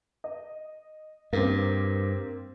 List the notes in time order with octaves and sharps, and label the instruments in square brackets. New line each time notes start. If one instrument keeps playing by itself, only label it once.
[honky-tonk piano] D#5
[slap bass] G2 [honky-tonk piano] A#3 C4